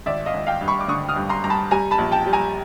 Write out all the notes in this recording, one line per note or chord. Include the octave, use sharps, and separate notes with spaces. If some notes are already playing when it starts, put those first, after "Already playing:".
G#1 D5 E5
D#5 F5
G#1
F5 G5
G2
B5 C#6
D6
D3 C#6 D#6
D#6 F6
G2
A#5 C6
G2 A#5
A5 B5
G3 G#5 A#5
A5 B5
A#1
G5 A5
G3
G#5 A#5